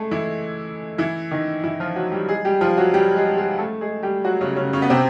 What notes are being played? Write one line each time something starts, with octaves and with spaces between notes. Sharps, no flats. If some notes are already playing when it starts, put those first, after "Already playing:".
Already playing: G#3 A3 G#4 A4
E3 E4
E3 E4
D#3 D#4
E3 E4
F3 F4
F#3 F#4
G3 G4
G#3 G#4
G3 G4
F3 F4
F#3 F#4
G3 G4
G#3 G#4
G#3 G#4
A3 A4
G#3 G#4
G3 G4
F#3 F#4
C#3 C#4
C#3 C#4
C#3 C#4
B3
C3 C4